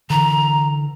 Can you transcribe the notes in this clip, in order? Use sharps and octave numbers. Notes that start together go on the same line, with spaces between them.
D3 E3 A#5